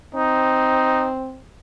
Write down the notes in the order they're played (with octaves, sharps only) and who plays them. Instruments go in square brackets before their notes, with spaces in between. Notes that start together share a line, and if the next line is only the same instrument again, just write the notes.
[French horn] C4 [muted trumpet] D#4